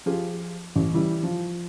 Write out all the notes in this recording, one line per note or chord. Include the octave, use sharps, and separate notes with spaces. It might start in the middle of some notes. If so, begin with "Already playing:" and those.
F3 F4 G4 G#4
A1
E3 G3 E4
F3